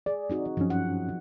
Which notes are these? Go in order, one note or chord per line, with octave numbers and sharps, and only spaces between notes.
G#4 D5
C4 D#4 F#4
G2 F3 F#3 C#4
F#5